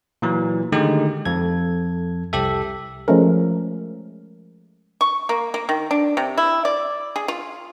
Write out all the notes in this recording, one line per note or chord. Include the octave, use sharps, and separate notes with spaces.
A#2 E3 F#3
D3 D#3 G#3 A3 D#4 G4
F2 A4 G#6
C2 G4 A4 E5
F3 G#3 A3 C#4 A#4
C#6
A#3
A#3
D#3
D4
C3
E4
D5
G#4
F4